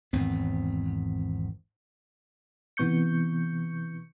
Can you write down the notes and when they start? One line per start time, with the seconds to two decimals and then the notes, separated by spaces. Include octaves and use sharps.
0.13 G#1 E2 B3 C4
2.77 C3 E3 B3 C#6 G6 C#7